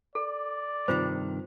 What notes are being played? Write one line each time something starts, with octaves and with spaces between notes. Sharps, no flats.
A4 D5
G2 C3 D#3 F4 C5